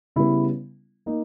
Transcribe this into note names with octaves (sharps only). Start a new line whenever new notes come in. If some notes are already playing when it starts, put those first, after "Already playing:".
C#3 G3 B3 E4
A#3 D#4